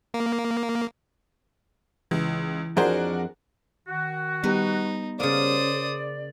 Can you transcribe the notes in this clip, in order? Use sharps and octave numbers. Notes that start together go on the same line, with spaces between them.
A#3
C#2 E3
F2 D4 F#4 G#4 A#4 C5
D#3 F#4
G3 B3 D#4 G4 B4
C#3 A#3 C5 D5 D#6